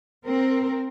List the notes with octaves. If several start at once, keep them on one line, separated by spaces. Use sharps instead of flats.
C4 A#4